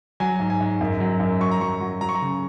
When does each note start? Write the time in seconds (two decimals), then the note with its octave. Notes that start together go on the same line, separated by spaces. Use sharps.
0.20 F#3 G#5
0.40 G#2
0.50 G#5
0.61 G#2
0.81 F#2
1.00 F#3
1.20 F#2
1.40 F#3 C#6
1.51 A#5
1.60 F#3 C#6
1.81 F#3
2.01 F#3 A#5
2.09 C#6
2.15 A#5
2.22 C#3